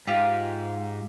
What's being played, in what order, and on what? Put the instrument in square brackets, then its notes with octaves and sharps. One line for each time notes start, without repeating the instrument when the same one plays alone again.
[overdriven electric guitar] G#2 [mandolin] F4 G4